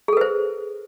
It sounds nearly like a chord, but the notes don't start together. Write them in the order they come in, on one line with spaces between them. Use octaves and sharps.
G#4 A4 B4 C5